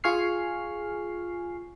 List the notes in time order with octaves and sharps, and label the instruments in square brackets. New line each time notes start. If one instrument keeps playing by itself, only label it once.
[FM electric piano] F4 G#4 G#5 C#6 F6 C7